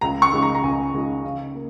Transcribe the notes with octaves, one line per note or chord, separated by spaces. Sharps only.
C#2 A#5
C#6
C#3 G#3 D#4
A#5
A#5
C#2 G#5
C#3 G#3 D#4
C#3 F5
A#3